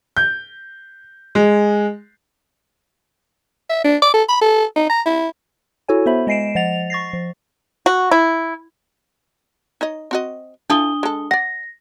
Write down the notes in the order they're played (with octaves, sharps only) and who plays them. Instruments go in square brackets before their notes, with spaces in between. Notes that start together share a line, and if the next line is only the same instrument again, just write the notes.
[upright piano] G6
G#3
[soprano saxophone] E5
D4
D6
A4
B5
A4
D#4
A#5
E4
[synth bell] E4 F#4 A4 C#5 G#5
B3 C5 E5 B5
G#3 D#5 G#5 C7 D7 E7
F3 D#5 F#5 A6 F7
C#6 A6 A#6 C7
F3
[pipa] F#4
E4
[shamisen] D#4 C#5 D#5
C4 F#4 D#5
[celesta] D4 D#6 G7 [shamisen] E4 F4 A4
[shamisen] G#3 A4
[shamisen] D5 F#5 [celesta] A#6